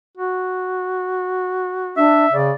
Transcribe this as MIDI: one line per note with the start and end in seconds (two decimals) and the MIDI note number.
0.17 2.11 66
1.97 2.26 62
1.97 2.34 76
2.33 2.52 49
2.33 2.56 74